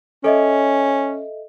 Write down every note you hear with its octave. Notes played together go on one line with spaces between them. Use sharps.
C#4 A4 D#5 E5